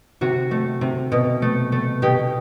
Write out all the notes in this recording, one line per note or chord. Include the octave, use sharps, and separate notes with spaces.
C3 F#4
A3
C3
B2
A3
A3
B2 G4